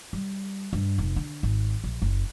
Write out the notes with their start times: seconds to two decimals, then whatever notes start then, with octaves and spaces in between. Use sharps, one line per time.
0.13 G3
0.73 G2
0.98 F1
1.16 D3
1.43 G#1
1.84 A#1
2.02 F#1